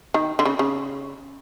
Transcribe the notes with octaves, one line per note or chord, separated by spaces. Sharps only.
D#3
D3
C#3
C#3